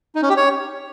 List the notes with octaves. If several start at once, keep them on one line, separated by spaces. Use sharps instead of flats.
D#4
C#4
G4
C#5